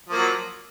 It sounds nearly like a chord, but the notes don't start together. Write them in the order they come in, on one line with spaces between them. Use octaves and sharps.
F3 A#3 F#3